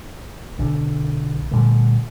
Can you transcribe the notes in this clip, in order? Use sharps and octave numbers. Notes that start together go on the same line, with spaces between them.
B1 D3
A#2 D3 G3 A3